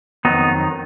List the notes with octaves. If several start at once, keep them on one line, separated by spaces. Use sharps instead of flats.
F2 D#3 F#3 B3 D#4